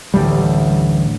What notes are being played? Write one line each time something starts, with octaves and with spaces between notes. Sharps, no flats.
A1 D2 G3